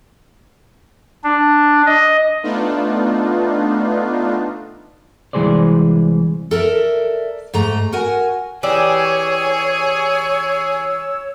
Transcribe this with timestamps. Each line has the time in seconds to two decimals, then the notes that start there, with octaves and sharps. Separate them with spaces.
1.24 D4
1.86 D#5
2.43 A3 B3 D4 D#4 F4
5.33 C2 E3 G#3 G#4 C5 D5
6.51 A4 A#4 D5 E5
7.54 G#2 A3 A#5
7.92 F#4 A#4 F#5 G#5
8.63 E3 G4 G#4 C#5 D5 G#5 E6